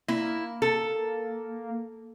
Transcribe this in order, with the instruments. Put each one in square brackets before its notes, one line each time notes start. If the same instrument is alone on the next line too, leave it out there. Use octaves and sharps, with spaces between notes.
[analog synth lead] A#3 [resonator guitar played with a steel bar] E4
[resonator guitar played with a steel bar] A4